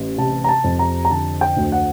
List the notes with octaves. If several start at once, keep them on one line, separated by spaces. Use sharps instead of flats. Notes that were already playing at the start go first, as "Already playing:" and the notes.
Already playing: A1
C3 A5
A#5
A5
F2
A#5
A#5
D3 A5
G5
D2
F#5